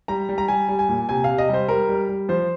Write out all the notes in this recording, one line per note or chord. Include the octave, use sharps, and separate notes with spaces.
G3 A#5
G3
A#5
G3 G#5
G3
G#5
A#2
C3 G#5
C3 F5
D#5
G3 C5
G3 A#4
G3
G3
F3 C5